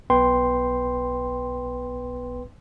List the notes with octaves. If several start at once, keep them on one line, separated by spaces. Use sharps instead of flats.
B1 B3 B4 G5 C6